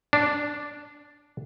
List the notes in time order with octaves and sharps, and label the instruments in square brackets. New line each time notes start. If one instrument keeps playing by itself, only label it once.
[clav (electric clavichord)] D4